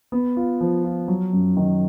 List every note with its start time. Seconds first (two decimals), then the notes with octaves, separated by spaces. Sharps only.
0.12 B3
0.37 F4
0.61 F3
0.84 F4
1.08 F#3
1.33 F#2
1.57 D#3